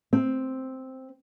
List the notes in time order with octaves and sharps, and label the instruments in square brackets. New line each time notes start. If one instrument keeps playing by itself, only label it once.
[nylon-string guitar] C4